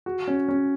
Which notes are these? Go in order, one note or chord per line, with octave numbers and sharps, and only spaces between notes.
F#4
C#4
C#4